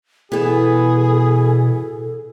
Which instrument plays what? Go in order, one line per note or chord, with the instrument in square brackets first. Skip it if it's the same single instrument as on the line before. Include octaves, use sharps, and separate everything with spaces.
[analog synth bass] B2 [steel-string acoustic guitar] E3 B3 [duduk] G#4 [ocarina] A4